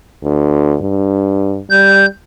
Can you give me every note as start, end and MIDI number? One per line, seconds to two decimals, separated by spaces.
0.24 0.76 38
0.81 1.62 43
1.70 2.05 55
1.70 2.06 91